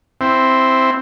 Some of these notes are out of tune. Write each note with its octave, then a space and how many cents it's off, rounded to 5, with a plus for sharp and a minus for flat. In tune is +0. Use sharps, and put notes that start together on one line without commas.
C4 +0 E4 +0